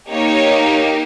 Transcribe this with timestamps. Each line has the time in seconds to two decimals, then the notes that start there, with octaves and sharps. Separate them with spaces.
0.10 A#3 D#4 G4 C#5